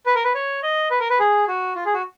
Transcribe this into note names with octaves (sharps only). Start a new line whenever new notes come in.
B4
A#4
B4
C#5
D#5
B4
A#4
B4
G#4
F#4
F4
G#4
F#4